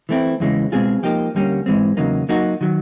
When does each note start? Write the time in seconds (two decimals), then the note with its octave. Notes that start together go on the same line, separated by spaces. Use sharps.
0.09 E3 A3 C4 E4
0.40 E2 C#3 E3 G#3
0.72 B2 G#3 C4 F4 G#4
1.03 F3 A#3 D#4 G4
1.35 D2 D3 G3 A#3 C#4
1.66 G#2 E3 G#3 C4
1.97 E2 C#3 F#3 A#3 D#4
2.29 F#3 A#3 D#4 F#4
2.61 D#3 F#3